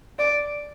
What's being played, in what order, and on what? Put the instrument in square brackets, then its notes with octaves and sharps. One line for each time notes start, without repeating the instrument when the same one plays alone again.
[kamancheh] D5